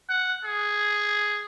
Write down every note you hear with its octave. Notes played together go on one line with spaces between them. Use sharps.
F#5
G#4